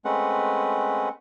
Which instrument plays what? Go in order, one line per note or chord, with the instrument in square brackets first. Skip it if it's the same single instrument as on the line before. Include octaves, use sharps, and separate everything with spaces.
[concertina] G#3 A3 C4 C#4 B4 F#5